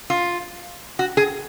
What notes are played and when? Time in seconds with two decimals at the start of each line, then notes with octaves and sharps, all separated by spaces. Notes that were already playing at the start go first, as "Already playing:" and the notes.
0.10 F4
0.99 F#4
1.17 G#4